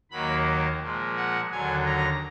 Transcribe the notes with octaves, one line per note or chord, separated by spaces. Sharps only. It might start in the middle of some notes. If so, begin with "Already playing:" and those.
D#2 D#3 F#3 A#3 B5
A#2 F3 G#3
F#5
D#2 D3 F#3 G#5
A#5